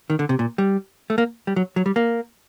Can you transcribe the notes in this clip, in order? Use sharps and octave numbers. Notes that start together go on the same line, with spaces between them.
D#3
D3
C3
A#2
G3
A3
A#3
G3
F#3
F#3
G3
A#3